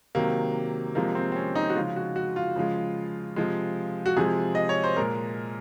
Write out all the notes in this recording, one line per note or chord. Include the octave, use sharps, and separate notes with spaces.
C3 D#3 F#3 A#3
C3 F3 G#3 A#3
C4
C4
C#4
D#4
F#4
C#3 F3 G#3 F4
F#4
F#4
F4
C#3 F3 G#3
C3 F3 G#3
F#4
C3 F3 G#3 G#4
D#5
C#5
C5
A#2 G#3 A#4